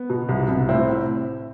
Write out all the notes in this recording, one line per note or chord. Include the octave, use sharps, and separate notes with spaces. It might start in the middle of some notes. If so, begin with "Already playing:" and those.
Already playing: B3
B2
C2
C2
A2 C4 E4